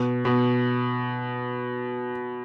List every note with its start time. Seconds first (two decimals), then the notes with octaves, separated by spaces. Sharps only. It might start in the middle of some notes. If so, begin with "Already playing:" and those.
Already playing: B2
0.25 B2